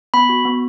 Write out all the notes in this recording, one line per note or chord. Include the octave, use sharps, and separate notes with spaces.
B3 B5
F#4
B3